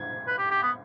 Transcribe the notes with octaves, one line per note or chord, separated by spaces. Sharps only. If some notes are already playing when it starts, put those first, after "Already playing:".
Already playing: G#6
B4
G4
G4
B3